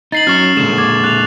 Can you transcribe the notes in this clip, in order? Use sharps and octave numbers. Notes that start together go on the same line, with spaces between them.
D#4 A6 C7 F#7
F#3 C#4 C#6 F6
A#2 D3 G#3 E7
D6 G#6
F#6 F7